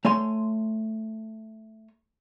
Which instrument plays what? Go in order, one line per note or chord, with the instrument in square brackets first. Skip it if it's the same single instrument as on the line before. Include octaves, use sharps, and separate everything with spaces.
[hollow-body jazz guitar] A3 C#5 G#5 C6